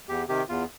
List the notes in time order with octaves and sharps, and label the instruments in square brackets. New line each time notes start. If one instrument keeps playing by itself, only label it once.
[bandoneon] E2 G4
C3 D#3 G4
E2 F4